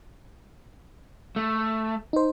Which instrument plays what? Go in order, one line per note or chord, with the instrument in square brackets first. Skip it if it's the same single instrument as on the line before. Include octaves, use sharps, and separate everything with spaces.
[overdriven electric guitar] A3
[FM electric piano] D#4 C5